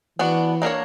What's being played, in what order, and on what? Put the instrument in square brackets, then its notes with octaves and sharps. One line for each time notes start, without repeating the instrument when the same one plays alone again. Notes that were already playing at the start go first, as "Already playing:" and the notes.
[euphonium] E3 [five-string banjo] B3 D4 F#4
[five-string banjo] A#3 D4 A#4 C#5